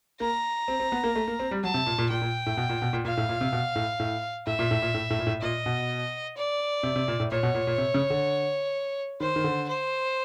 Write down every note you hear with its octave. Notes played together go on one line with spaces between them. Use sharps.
A#3 A#5
C4
C4
B3
A#3
A3
A#3
C4
G3
F#3 A5
C3
A#2
A#2
A#2 G5
A#2
A2
B2
A#2
B2
A#2
A#2 F5
A2
A#2
C3
B2
A2
A2
A2 E5
A#2
A2
A#2
A2
A2
A#2
A2
A#2 D#5
B2
D5
C3
C3
A#2
A2
A#2 C#5
B2
A#2
A#2
C3
C#3
D3
D#3 C5
D#3
D3
C5